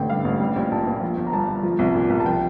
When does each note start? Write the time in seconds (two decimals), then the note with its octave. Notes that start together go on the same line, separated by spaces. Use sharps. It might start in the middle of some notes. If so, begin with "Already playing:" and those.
Already playing: A1 D3 G5
0.10 G2 F5
0.25 A1
0.40 G3
0.56 A#1
0.72 A#2 A5
0.87 A#1
1.02 F3
1.18 G1
1.27 A#5
1.33 G2 A5
1.49 G1
1.63 F3
1.79 C2
1.95 A#2
2.10 C2
2.20 A5
2.26 F3 G5